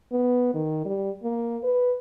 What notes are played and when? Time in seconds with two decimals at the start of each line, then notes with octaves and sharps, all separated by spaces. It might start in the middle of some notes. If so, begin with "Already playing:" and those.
0.12 B3
0.54 D#3
0.85 G3
1.23 A#3
1.63 B4